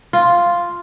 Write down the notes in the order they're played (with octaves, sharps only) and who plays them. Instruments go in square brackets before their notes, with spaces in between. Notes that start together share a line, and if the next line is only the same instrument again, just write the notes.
[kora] F4